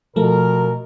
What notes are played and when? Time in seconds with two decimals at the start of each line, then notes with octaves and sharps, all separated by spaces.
0.16 B2 F3 A3 A#4